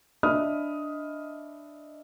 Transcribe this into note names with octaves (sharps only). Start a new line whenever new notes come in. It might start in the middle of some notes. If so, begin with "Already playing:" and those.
D4 D#5 E5 B5 D#6 F6